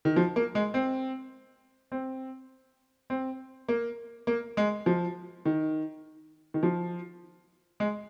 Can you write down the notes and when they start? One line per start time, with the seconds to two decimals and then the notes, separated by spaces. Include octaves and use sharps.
0.05 D#3
0.16 F3
0.36 A#3
0.55 G#3
0.74 C4
1.92 C4
3.10 C4
3.69 A#3
4.27 A#3
4.57 G#3
4.86 F3
5.45 D#3
6.54 D#3
6.63 F3
7.80 G#3